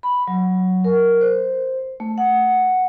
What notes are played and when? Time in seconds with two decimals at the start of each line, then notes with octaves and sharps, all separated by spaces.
0.03 B5
0.28 F#3
0.84 A#4
1.21 C5
2.00 A3
2.18 F#5